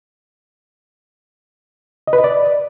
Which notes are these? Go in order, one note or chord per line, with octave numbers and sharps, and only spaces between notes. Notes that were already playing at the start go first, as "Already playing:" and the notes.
D#5
B4
D#5
D5